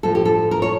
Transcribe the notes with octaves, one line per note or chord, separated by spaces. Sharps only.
A2 F3 A4
G4
A4
A#4
C#5